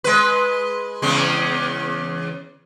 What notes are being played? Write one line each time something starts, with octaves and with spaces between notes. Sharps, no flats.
G#3 B4
E2 C#3 G#3